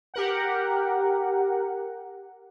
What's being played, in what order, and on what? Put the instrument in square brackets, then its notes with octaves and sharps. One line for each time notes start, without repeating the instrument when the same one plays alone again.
[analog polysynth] G4 A#4 F#5